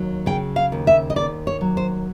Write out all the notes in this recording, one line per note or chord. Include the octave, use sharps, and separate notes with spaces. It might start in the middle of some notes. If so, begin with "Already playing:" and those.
Already playing: D#2 F#3
C#3 G5
F5
D#2
E5
D#5
D#2 D5
C#5
F#3
C5